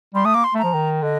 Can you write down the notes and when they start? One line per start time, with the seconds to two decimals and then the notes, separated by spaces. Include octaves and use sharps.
0.14 G3 C6
0.25 A3 D#6
0.34 A#3 D6
0.44 C6
0.54 A3
0.58 A#5
0.64 F3
0.74 D#3
1.02 D3 D#5